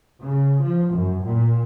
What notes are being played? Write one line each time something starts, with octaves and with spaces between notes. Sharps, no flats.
C#3
F3
F#2
A#2